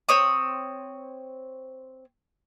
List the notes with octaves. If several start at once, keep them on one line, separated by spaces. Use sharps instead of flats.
C4 C#5 D#6